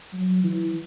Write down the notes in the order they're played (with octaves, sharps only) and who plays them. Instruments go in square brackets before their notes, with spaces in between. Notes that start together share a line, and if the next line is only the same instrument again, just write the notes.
[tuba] F#3
E3